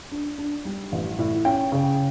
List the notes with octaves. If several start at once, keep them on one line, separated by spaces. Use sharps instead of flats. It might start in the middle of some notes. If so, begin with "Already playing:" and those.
D4
D4
G3
A1
A2
C#4 G5
C#3